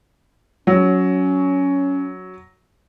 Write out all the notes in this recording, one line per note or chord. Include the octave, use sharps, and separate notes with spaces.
F#3 C#4